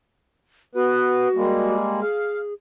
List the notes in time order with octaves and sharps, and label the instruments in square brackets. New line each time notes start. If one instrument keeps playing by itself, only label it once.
[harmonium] B3 B4 [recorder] F#4
[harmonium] G3 G#3 A#3
[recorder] G#4 [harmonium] F5